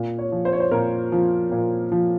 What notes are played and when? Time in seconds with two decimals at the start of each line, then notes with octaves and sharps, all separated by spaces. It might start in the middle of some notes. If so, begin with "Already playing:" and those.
Already playing: A#2
0.19 C#5
0.32 F3
0.45 C5
0.53 C#5
0.60 C5
0.71 A#2 A#4
1.12 F3
1.52 A#2
1.92 F3